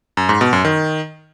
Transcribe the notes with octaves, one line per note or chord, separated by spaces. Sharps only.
F#2
G#2
B2
F#2
D#3